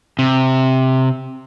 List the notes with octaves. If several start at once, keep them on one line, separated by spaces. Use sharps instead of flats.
C3